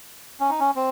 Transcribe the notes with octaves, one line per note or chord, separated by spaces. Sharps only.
C#4
D#4
C#4
C4